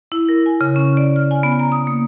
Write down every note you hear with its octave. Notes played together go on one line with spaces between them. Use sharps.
E4
A#4
G#5
C#3
C#4
D5
F6
G#5
B3
A#5
D#6
A#3